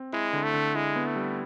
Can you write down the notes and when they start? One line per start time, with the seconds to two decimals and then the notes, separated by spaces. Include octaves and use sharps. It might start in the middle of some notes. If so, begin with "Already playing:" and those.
Already playing: C4
0.13 G#3 E4
0.33 D3
0.43 A3
0.54 D3
0.75 G#3 E4
0.96 B3
1.06 A3
1.16 G3